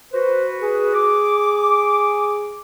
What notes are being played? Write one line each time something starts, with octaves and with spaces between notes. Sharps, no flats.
F#4 B4 C5
G#4
D6